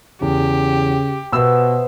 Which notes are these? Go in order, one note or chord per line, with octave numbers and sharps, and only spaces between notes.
E2 C#3 G4
B2 B3 C5 E5 E6